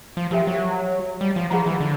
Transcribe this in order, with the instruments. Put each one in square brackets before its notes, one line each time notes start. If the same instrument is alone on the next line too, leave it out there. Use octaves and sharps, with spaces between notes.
[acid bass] F3
[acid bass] F3 [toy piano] G4 A#4 C#5 E5 G5
[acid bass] F#3
G3
F3
[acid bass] F3 [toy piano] F4 G#4 C#5 F#5 A#5
[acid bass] E3
D3